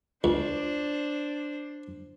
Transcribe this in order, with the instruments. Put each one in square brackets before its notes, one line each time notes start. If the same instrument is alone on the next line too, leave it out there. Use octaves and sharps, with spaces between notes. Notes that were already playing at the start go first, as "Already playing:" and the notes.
[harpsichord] C#2 [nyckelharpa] D4 C5